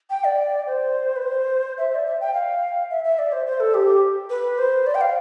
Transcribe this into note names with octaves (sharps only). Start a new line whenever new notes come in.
G5
D5
C5
B4
C5
E5
D5
E5
G5
F5
E5
E5
D5
C5
C5
A4
G4
B4
C5
D5
G5
F5